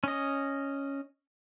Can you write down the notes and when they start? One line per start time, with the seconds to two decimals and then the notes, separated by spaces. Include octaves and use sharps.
0.04 C#4 D#5